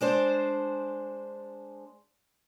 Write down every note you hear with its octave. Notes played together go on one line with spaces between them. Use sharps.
G#3 D4 C5